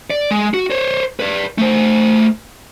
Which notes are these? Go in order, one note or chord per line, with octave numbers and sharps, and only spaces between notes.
D5
G#3
F#4
C5 C#5
B4 D5
A3 C5